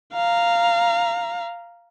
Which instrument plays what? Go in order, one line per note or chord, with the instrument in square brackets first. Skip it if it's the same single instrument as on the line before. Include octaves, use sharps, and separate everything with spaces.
[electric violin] F5 A#5